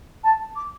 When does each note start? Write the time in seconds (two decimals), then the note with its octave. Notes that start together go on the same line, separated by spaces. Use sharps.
0.23 A5
0.55 D6